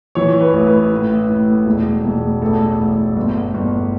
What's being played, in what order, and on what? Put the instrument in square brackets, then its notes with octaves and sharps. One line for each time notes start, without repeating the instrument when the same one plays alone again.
[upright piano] E3 C#5
B4
A1
B4
A2
A2
E1
E1
A1 A4
A1
G1
G1